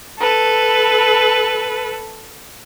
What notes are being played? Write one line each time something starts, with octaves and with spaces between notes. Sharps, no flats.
A4 B4